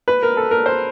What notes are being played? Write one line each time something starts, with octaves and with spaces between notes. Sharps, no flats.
B4
A#4
A4
A#4
C5